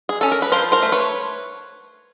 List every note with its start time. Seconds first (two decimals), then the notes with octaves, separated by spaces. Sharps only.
0.09 G#4
0.21 C#4 A4
0.32 A#4
0.42 B4
0.52 F3 A#4 C5
0.72 A#4 C5
0.82 A3
0.92 B4 C#5